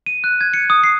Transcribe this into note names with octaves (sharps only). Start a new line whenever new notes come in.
D#7
F#6
G#6
C#7
D#6
C7